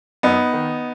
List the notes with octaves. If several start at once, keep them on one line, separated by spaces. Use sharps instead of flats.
F#2 B3 D#4
D#3